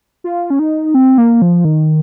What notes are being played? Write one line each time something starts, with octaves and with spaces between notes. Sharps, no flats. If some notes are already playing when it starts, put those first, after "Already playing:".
F4
C#4
D#4
C4
A#3
F3
D#3